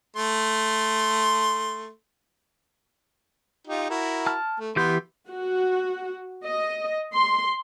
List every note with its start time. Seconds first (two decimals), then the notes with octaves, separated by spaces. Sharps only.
0.16 A3 C6
3.67 D#4 F4 G4
3.90 E4 F#4 A#4
4.27 A5 F6
4.60 A3
4.76 E3 B3 G4 C6 G6
5.29 F#4
6.45 D#5
7.15 C6